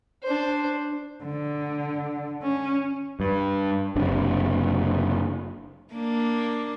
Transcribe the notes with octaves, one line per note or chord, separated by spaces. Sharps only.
D4 C5
D3
C#4
G2
F#1 C3 D4
A#3 D4